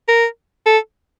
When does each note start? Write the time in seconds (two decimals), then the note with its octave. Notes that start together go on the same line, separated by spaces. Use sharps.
0.08 A#4
0.66 A4